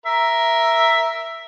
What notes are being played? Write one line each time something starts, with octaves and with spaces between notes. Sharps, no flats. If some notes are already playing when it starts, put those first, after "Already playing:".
A#4 E5